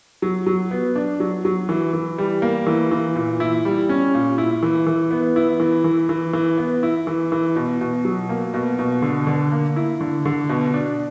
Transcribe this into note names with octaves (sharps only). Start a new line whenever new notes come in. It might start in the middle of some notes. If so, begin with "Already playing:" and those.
F#3
F#3
B3
D4
F#3
F#3
E3
E3
G3
A#3
E3
E3
A#2
E4
G3
C#4
A#2
E4
E3
E3
B3
E4
E3
E3
E3
E3
B3
E4
E3
E3
B2
B2
F#3
A#3
B2
B2
D3
D3
A#3
E4
D3
D3
B2
D4